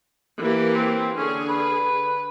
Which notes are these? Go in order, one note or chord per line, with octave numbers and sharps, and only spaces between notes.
E3 A#3 G4
C4
D3 C#4 G#4
B4